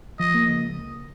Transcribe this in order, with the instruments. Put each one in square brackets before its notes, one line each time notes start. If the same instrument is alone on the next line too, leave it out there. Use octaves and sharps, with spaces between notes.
[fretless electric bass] F3 [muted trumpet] D#5
[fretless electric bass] A#3
C#2